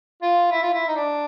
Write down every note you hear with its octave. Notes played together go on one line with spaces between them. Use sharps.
F4
E4
F4
E4
D#4
D4